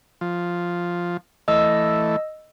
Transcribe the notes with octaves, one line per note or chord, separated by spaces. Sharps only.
F3
E3 A3 D#5 E6